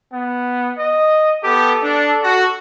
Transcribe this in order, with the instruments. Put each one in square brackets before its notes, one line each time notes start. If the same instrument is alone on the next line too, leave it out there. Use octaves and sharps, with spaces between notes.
[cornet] B3
D#5
[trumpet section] B3 G4 [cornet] A4
[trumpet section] D4
F#4